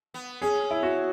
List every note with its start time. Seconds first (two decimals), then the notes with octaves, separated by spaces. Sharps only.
0.14 B3
0.42 C#4 G#4
0.71 E4
0.83 F#4